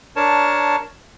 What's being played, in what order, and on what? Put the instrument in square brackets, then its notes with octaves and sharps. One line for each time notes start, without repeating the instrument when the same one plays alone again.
[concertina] D4 A#4 C#5 A5